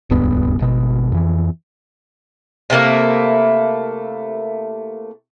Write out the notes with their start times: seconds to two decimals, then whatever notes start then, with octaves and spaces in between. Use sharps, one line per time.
0.10 D#1 C#2 G2 B3
0.60 G#1 B2
1.12 F2 E3
2.70 C3 A3 A#3 E4